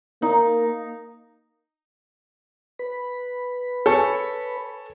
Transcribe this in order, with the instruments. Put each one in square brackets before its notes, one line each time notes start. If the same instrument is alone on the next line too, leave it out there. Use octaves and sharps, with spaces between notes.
[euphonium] A#3 [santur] D#4
[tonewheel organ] B4 B5
[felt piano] A4 C#5 G#5